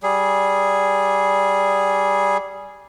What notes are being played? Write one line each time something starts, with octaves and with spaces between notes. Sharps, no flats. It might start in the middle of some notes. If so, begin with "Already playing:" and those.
G3 G#4